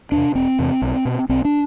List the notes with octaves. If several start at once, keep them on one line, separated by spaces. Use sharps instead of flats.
E2 C3 D4
E1 C4
E2 C3
B1
B2
B1 C4
D4